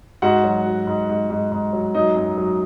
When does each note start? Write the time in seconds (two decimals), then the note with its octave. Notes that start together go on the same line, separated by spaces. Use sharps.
0.22 G#2 F#4 F#5
0.44 F#3
0.66 F#3
0.87 G#2
1.09 G#2
1.30 G#2
1.52 G#2
1.73 F#3
1.95 F#3 D#4 D#5
2.16 F#2
2.38 F#3